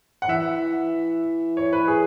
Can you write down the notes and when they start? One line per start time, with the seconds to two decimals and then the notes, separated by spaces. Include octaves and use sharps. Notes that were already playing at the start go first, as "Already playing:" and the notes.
0.22 F#5
0.28 E3 E5
1.57 C#5
1.73 B4
1.88 G#4